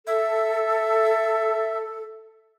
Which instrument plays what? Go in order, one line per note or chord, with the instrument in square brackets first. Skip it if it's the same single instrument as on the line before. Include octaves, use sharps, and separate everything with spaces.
[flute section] A4 [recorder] E5